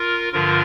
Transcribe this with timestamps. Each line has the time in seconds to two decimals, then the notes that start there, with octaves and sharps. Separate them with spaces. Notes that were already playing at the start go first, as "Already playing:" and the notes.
Already playing: F4 A#4
0.33 G2 D3 F3 F4 A#4